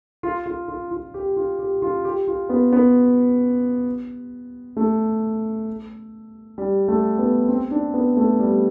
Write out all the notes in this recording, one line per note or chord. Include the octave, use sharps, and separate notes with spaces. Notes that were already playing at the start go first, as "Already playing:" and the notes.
F4
F4
F4
F4
G4
F4
G4
F4
G4
F4
B3
B3
A3
G3
A3
B3
C4
D4
B3
A3
G3